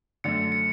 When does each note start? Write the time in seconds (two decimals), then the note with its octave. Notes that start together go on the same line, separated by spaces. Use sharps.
0.24 F#2 D3 A3 D4 C#7
0.52 C#7